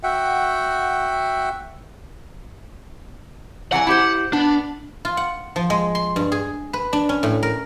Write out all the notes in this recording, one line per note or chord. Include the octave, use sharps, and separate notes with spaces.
F#4 E5 F#5 G5
E3 F#3 F#5 G#5
E4 G4 C5
B3 D4
F4
F#5
F3
G#3
C6
G2
G#4
B4
D4
C#4
A2
A#4